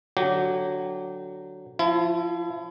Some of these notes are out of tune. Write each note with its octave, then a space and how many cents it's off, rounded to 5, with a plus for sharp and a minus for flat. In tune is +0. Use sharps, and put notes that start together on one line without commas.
D3 +0 F#3 +0 G4 -25
F3 +0 E4 +35